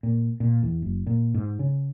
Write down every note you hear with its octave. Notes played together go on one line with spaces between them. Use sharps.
A#2
A#2
E2
F#1
A#2
G#2
C#3